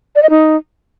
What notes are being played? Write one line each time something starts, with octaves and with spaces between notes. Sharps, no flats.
D5
D#5
D#4